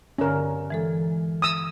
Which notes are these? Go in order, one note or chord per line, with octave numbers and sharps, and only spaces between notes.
G2 D3 C#4 A#4
E3 G#3 A4
D#6 E6